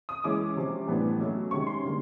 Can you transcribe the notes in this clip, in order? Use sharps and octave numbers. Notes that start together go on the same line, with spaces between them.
D#6
E3 G#3 C#4 E4 D6
C3 F3 G#3 C#4
A2 E3 G3 B3 D4
B2 F#3 A3 C#4
C3 D#3 G#3 C#4 C#6
C6
D3 G3 A#3